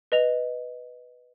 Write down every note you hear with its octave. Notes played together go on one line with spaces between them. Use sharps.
B4 D#5 F7